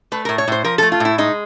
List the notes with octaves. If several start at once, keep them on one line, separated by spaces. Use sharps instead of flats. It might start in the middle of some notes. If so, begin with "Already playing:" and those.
A3 B4
A2 A#4
C#5
A2 C5
F3 A#4
A3 A4
F4
A2 E4
G#3 D#4